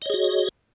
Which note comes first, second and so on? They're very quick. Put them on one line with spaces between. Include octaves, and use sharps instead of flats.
D#5 C#5 G#4 F#4